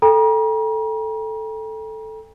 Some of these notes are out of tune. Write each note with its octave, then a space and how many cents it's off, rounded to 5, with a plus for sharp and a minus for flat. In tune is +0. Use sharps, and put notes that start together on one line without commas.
A4 +0 G5 +40 A#5 +40